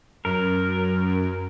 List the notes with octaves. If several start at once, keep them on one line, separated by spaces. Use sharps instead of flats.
F#2 A#4